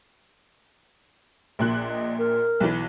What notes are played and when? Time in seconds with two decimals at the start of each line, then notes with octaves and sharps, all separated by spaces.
1.59 A#1 A#2 F#6
1.90 D#5
2.18 A#4
2.60 B1 E3